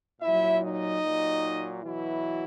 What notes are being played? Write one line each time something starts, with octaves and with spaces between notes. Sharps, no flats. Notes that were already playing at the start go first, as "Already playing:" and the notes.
A#2 F#3 E4 E5
D#4 D#5
A#2 F#3
B2 E3 F#3 E4